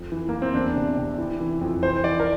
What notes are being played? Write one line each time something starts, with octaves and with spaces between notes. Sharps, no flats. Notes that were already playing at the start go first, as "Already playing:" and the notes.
Already playing: F2
E3
E3 A#3
C4
E2 D4
C3
C3
E3
E3
F2
E3 C5
E3 D5
A#4